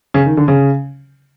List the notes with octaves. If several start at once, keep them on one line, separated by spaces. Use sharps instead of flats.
C#3
D#3
D3
C#3